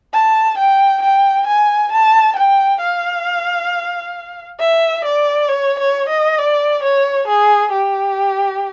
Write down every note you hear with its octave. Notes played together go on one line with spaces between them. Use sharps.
A5
G5
G5
G#5
A5
G5
F5
E5
D5
C#5
C#5
D#5
D5
C#5
G#4
G4